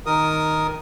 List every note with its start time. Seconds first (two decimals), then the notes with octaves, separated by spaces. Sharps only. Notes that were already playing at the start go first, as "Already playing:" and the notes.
0.06 D#3 A#4 D#6